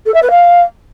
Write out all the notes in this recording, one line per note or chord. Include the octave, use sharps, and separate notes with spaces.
A4
E5
B4
F5